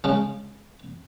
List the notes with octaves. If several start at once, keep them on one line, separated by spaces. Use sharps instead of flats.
C#3 G#3 C#4